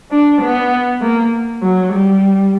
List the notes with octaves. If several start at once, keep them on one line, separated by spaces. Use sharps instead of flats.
D4
B3
A#3
F#3
G3